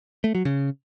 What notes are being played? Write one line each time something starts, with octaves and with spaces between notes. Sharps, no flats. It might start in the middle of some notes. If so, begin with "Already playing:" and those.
A3
F#3
C#3